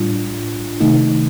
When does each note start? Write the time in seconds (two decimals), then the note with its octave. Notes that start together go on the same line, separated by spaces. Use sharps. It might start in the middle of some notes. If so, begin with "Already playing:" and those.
Already playing: A2 G3 D4 F4
0.80 C3 D#3 A3 D#4